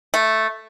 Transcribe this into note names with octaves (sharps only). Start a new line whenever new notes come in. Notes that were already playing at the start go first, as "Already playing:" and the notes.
A3